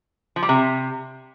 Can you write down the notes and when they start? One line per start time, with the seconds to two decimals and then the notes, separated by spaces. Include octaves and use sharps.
0.36 F3
0.42 G3
0.49 C3